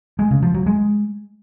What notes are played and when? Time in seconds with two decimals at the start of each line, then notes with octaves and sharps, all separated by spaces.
0.19 G#3
0.31 C#3
0.42 F3
0.54 F#3
0.66 G#3